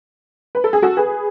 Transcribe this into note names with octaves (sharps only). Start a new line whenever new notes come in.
B4
A4
G#4
F#4 A4
G#4 B4